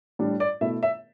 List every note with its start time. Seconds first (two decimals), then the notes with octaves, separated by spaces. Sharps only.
0.19 A2 G3 D4
0.40 D5
0.61 B2 A3 E4 E5
0.83 E5